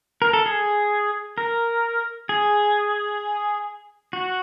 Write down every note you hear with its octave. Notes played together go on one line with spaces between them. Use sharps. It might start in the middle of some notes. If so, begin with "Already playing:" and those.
A#4
A4
G#4
A#4
G#4
F#4